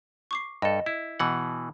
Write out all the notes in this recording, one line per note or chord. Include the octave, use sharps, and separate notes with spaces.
C#6 D6 C7
G2 A4 D#5
E4
B2 E3 F#5